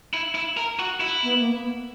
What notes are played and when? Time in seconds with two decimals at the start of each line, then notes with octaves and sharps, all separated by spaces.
0.14 E4
0.35 E4
0.57 A#4
0.79 F#4
1.00 E4
1.23 B3
1.39 A#3
1.55 B3